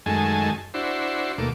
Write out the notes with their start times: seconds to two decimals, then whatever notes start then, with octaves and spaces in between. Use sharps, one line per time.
0.06 F#2 D#3 G#3 A3 G#5 A5
0.74 D4 E4 F#4 C5
1.38 D#2 B2 A3 A#3 D6